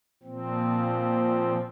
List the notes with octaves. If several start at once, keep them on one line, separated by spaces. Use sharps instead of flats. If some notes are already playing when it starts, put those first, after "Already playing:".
A#2 F3 C4